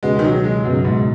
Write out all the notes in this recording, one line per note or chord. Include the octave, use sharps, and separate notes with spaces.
C#2 B2 G#3 B3 F#4
D#3
F#3
G#3
C#2 F#2 B2 B3 F#4
G#2